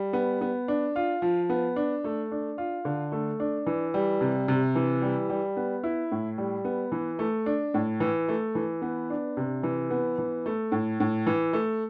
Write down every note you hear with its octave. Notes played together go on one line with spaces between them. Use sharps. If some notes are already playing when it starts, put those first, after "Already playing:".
Already playing: G3
B3
B3
D4
F4
F3
B3
D4
A3
D4
F4
D3
A3
D4
E3
G3
C3
C3
E3
G3
G3
B3
E4
A2
G3
B3
E3
A3
D4
A2
E3
A3
E3
B3
D4
C3
E3
B3
E3
A3
A2
A2
E3
A3